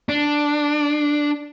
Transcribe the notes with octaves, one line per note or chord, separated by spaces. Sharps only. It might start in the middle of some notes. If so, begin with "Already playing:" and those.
D4